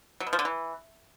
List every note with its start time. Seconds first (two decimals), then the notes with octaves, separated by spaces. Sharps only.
0.20 F#3
0.27 B2
0.33 F3
0.39 D3
0.45 E3